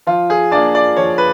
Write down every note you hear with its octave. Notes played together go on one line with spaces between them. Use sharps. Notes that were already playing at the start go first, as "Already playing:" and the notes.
F3 F4
G#4
A#3 D4 D5
D5
F3 C#5
B4